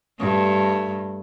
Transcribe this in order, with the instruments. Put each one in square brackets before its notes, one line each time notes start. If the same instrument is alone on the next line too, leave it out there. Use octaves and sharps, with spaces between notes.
[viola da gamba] G2 A3